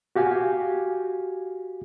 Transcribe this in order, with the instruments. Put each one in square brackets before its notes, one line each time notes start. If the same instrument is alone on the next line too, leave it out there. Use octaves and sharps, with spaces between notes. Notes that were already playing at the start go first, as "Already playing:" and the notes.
[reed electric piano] F#4 G4 F5 G#5